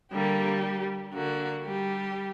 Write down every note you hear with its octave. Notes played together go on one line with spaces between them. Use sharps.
D3 G3 A#3 G4
D3 A#3 F#4
G3 G4